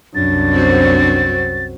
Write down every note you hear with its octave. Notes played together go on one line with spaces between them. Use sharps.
C2 F#2 D4 A6
C4 F#4 C5